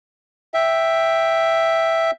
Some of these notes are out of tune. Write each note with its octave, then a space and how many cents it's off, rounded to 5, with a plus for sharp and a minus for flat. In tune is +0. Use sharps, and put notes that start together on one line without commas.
E5 +0 G5 +0